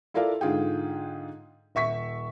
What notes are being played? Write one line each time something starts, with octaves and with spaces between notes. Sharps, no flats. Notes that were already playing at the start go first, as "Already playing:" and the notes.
E4 F4 A4 A#4 D5 F5
G#2 D3 F4 G#4 G5
D#1 E5 C#6 B6